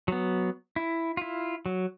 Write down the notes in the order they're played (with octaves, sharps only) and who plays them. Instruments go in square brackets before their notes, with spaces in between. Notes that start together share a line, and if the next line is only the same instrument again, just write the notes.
[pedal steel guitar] F#3 B3
E4
E4 F4
F#3